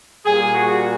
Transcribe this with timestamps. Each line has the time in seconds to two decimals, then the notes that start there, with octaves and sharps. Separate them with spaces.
0.25 A#2 G3 G#4
0.54 F#4